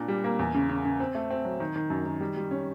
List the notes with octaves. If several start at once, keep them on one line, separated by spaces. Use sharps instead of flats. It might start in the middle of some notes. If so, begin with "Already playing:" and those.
Already playing: A#2 D4
G3
A#3
E2
C#3
C#3
C#3
C4
A3
C4
F#3
D#3
D#3
F#2
D#3
G3
G3
C#4